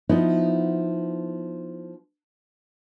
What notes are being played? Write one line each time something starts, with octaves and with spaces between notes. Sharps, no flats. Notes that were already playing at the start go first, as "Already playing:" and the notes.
F3 B3 D#4 E4